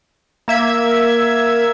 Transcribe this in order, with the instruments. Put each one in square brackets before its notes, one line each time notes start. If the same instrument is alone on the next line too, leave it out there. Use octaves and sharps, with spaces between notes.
[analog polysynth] A#3 E5 G#6